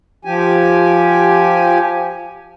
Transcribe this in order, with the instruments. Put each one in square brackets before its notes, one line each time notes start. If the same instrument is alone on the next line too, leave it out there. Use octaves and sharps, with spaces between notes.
[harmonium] F3 G4 G#5